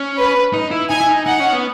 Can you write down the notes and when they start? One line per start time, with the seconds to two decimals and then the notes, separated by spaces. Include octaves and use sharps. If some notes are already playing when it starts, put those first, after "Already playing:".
Already playing: C#4
0.18 B4
0.53 D#4
0.71 E4
0.90 D#4 G#5
1.01 E4
1.09 D#4
1.26 D#4 F#5
1.40 C#4
1.53 B3